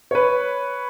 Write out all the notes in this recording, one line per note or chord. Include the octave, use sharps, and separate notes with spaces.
B4 C#5